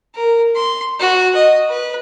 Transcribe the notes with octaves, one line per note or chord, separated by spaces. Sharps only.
A#4
C6
F#4
D#5
B4